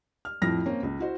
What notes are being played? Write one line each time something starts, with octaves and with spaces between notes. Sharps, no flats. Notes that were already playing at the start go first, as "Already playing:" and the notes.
F6
F2 A2 F3 E4 F6 A#6
A#3 C4 C#4
C#2
E4 F#4 C5